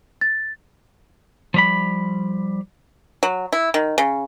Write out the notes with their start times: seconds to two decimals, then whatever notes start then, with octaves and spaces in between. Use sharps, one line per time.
0.21 A6
1.54 F3 G3 B5
3.23 F#3
3.53 E4
3.74 D#3
3.98 C#3